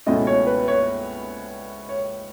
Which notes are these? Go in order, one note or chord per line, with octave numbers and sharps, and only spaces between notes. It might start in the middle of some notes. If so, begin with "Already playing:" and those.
C#2 B2 A3 C#4 E4 D#5
C#5
B4
C#5
C#5